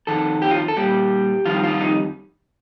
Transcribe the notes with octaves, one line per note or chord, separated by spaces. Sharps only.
F2 D#3 A4
G4
F4
A4
A#2 G3 G4
F2 D#3 G3 F4
F4
D#4